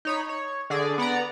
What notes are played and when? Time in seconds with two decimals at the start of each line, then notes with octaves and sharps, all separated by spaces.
0.05 D#4 C#5 B5
0.29 C#5
0.70 D3 G#4 D5
0.98 B3 D5 F#5 A#5